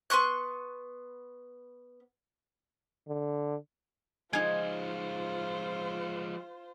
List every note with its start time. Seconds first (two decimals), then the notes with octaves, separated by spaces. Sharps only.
0.10 B3 C6 C#6 F#6
3.08 D3
4.33 F3 G#3 D#4 F4 C5 G#5